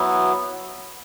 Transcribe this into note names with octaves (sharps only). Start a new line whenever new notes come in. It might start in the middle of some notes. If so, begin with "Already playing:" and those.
Already playing: F#3 B3 E4